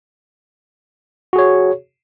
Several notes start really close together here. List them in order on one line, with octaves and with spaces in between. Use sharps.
F#4 G#4 C#5